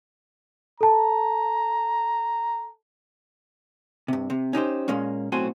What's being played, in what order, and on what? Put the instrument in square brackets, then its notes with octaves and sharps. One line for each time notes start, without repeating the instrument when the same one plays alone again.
[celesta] A4 A5 [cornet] A#5
[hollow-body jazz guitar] G2 C3
C3
C#4 D#4 G4 C5
A#2 G#3 A#3 C#4
B1 A2 C4 F#4 G#5 C6